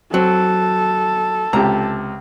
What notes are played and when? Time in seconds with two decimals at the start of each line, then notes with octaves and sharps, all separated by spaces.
0.14 F#3 C4 A4
1.53 C#2 C3 G4 A#5